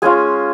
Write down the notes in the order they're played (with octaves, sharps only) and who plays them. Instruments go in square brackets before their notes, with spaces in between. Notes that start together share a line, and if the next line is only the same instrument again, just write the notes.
[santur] G#3 C#4 F4 G#5